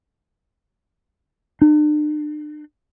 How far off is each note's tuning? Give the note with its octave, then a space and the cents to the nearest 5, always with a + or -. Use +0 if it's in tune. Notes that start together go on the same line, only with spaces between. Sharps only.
D4 +40